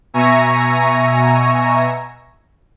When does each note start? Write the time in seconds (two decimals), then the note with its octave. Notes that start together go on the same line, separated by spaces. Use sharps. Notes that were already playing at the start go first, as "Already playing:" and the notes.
0.14 B2 E5 G#5 A#5 C#6 A#6